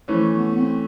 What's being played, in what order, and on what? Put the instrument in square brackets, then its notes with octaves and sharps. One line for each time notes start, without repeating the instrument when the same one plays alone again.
[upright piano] E3 A3 C#4 [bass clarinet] F3
[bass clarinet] B3
B3
C4